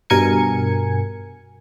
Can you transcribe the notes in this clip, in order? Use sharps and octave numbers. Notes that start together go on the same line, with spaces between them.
G2 B2 A#4 G#5 G#6 C#7